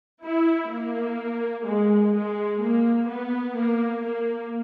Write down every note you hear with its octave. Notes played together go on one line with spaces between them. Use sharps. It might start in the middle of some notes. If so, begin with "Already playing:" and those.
E4
A#3
G#3
G#3
A#3
B3
A#3
A#3